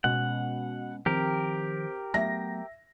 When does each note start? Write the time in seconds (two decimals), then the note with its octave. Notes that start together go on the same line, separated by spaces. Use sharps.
0.04 B2 G#3 B3 C#4 F#5
1.06 D#3 F3 C4 G4 A#4
2.14 F#3 A3 B3 E5 A#6